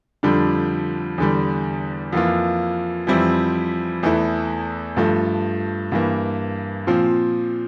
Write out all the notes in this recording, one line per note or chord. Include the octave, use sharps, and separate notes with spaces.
F2 D3 G3 D4
E2 D3 G3
F2 E3 A#3 F4
F2 E3 G3 C4 E4
E2 E3 A3 E4
G2 F3 A3
G2 E3 A#3
A#2 F3 C4